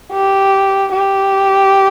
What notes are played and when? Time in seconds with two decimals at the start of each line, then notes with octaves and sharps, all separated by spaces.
0.12 G4
0.92 G4